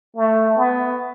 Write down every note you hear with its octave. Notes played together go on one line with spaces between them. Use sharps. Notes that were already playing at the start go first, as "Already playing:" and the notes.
A3
B3